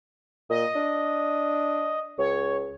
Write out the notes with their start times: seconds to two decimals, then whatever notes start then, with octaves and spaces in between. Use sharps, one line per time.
0.50 A#2 D#5
0.75 D4
2.18 C#2 C#5